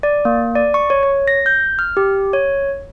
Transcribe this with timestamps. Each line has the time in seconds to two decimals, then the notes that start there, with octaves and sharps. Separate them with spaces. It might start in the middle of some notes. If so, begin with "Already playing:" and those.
0.03 D5
0.25 A#3
0.55 D5
0.74 C#6
0.90 C#5
1.03 C#5
1.28 A#6
1.46 G6
1.79 F6
1.97 G4
2.33 C#5